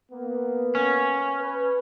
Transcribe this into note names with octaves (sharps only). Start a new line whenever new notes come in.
A#3 B3
C#4
B4